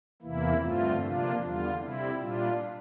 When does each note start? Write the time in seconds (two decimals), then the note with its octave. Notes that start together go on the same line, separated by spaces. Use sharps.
0.22 E2 C3 E3 A#3 E4
0.61 G2 D3 A3 C4 F4
1.00 C3 F3 A#3 D4 F4
1.39 E2 D3 G3 F4
1.79 C3 G3 C4 E4
2.18 A#2 G3 D4 F4